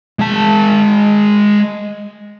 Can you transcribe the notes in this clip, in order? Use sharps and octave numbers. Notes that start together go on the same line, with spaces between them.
G#3 A5